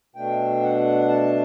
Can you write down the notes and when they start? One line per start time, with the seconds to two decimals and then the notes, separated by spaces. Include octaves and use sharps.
0.16 B2 A3 D4 G5
0.63 F#5
1.08 A5